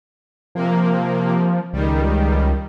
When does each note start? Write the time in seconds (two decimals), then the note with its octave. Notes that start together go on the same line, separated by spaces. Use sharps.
0.55 C3 F3 A#3
1.73 C#2 D#3 G3